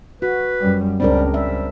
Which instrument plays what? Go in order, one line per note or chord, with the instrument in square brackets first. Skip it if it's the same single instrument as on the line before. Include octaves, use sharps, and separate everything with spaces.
[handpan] F#4 [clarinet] B4
[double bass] F#2 G3
[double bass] C#2 [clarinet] G3 [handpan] C4 D4 A#4
[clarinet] G3 [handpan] E5